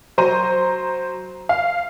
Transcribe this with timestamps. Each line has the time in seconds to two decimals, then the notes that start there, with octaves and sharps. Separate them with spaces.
0.18 F#3 C5 A#5 D#7
1.49 F5